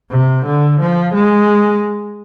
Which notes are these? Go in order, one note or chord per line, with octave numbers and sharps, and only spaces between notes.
C3
D3
F3
G#3